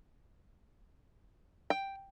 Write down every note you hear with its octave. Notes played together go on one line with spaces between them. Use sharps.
G5